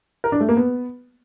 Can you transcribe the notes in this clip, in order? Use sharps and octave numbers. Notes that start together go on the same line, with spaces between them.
A#4
D4
A3
A#3
B3